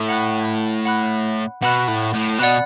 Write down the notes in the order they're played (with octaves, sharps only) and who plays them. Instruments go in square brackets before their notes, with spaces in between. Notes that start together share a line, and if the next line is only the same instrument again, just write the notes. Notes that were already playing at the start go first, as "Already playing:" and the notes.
Already playing: [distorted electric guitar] A2
[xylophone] F#5 B5 F#6
F#5 B5 F#6
[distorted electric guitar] B2 [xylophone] F#5 B5 F#6
[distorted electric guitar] A2
A2
[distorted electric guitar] B2 [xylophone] D5 F#5 B5 F#6